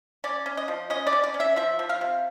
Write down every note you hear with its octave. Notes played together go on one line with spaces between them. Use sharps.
C#4 D5
C#4
D#5
F3
C#4 D#5
D5
C#4
D5
C#4
E5
F3 E5
F3
F5
C3